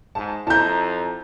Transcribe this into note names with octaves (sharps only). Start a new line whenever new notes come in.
G#2 A5
F2 E4 A5 A#5 G6